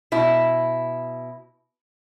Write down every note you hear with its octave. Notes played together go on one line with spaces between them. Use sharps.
B2 E4